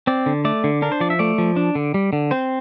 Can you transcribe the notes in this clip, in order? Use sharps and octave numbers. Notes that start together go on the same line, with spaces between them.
C4 D5
D3
A3 D5
D3
D4 A#4
C5
F3 D5
E5
A3 D5
F3
D4
D3
G3
D3
C4 C5